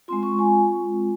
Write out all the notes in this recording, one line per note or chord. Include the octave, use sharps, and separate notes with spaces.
G#3 C4 F4 C6
C#6
G#5